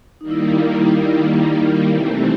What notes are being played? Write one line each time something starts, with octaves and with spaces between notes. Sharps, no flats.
D#3 G3 A#3 D#4
E4
D#4
E4
D#4
E4
D#4
E4
C3 E3 A3 C4